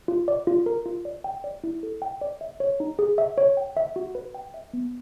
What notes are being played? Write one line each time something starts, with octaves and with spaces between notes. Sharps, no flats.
F4
D5
F4
A#4
F4
D5
G5
D5
E4
A4
G5
D5
E5
C#5
D#4
G#4
E5
C#5
G5
E5
F#4
B4
G5
E5
B3